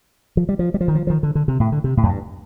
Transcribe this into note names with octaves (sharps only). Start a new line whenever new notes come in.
F3
G3
F3
G3
F3
D#3
F3
F3
D#3
D3
D3
C3
A2
D3
C3
A2
F2
G2